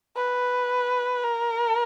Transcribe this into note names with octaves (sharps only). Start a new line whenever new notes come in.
B4
A#4